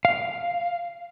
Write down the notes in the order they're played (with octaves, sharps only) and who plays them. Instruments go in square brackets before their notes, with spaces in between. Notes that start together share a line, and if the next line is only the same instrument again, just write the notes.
[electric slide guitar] F5